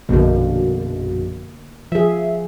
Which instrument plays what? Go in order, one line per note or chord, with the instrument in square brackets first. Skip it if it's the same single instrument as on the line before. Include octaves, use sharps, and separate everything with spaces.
[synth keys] A#1 F#2 B2 [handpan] D3 A#3
[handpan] F3 G#4 [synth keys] E5